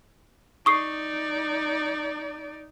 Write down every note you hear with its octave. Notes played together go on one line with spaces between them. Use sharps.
D#4 D5 C#6 D#6 C7